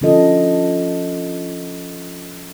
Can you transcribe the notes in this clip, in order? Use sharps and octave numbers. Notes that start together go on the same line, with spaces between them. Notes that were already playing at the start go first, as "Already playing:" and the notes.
D3 F3 C#4 F4 A4 D#5